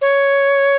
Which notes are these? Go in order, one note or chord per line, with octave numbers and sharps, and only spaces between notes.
C#5